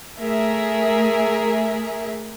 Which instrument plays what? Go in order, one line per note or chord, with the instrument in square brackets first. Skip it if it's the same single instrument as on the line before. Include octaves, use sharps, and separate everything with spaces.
[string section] A3 G#4 A#4 E5